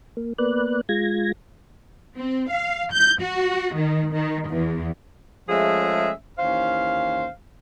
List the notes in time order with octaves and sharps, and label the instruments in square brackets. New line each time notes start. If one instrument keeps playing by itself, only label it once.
[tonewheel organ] A#3
A#3 B3 B4 D5 F#6
G#3 F4 G#6 A#6
[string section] C4
F5
G6
F#4
D#3
D#3
E2
[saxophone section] F3 G#3 A3 C#4 G#4 E5
D#2 E3 C#4 C5 F5